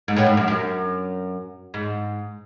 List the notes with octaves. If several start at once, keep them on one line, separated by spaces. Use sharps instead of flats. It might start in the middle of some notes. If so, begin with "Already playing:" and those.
G#2
A2
G#2
F#2
F#2
G#2